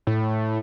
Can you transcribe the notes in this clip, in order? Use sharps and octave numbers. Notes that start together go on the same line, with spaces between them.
A2